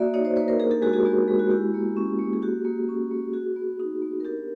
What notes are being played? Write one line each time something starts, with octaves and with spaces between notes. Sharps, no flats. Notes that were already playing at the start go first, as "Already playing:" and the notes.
Already playing: A#3 F#4 D5 E5
D#4 C#5 D#5
C5 D5
A#3 B4 C#5
A#4 C5
D4 G#4 A#4
G4 A4
G#3 F#4 G#4
G4
F#4 G#4
B3 G4
G#3
F#4
E4 G4
A#3
C#4
A#3
G#4
F#4 G4
A#3
C#4
A#3
F#4 G#4
B3
D#4
B3
A#4
D4 G4 A4